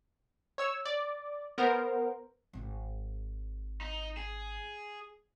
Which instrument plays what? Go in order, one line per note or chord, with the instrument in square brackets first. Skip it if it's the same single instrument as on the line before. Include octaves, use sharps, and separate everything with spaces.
[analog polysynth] C#5 E6
D5
B3 A#4 C5
[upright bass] G#1 G#2
[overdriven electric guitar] D#4
G#4